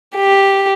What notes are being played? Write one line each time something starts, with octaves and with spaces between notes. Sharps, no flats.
G4